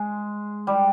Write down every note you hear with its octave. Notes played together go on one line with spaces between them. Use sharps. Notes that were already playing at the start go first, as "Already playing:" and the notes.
Already playing: G#3
G3